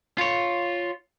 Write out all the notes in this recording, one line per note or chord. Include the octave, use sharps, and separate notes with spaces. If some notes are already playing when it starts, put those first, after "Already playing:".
F4 C#5